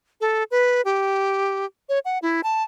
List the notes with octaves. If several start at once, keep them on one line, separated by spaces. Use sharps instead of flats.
A4
B4
G4
C#5
F#5
E4
A5